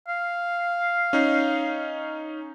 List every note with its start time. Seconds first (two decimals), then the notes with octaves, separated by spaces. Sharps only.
0.08 F5
1.13 C#4 D#4